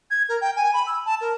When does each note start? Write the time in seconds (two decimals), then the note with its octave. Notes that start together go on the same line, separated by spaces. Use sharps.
0.11 G#6
0.29 A#4
0.41 G5
0.56 G#5
0.73 B5
0.87 E6
1.06 A5
1.21 A#4